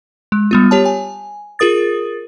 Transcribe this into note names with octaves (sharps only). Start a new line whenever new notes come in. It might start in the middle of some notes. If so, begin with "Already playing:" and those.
G#3
G3 B3 F4
G4 C#5 A5
G#5
F4 G#4 A#4 D#6 A6